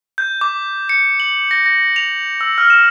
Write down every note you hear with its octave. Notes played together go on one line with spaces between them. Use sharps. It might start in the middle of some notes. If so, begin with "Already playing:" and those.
G6
D6
C#7
F#7
A#6
A#6
F7
E6
F6
E7